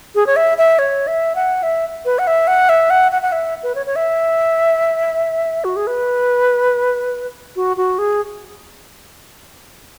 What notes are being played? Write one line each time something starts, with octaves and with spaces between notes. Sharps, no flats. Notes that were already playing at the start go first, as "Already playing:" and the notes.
G#4
C#5
E5
E5
C#5
E5
F#5
E5
B4
F#5
E5
F#5
E5
F#5
F#5
F#5
E5
B4
C#5
C#5
E5
F#4
G#4
B4
F#4
F#4
G#4